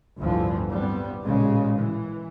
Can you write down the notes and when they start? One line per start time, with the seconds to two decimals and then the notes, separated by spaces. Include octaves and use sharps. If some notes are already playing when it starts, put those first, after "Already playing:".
0.19 G1 D2 A2 D3 E3 F3
0.70 G2 G3 B3 C4
1.23 A1 A#2 C#3 G#3
1.77 E3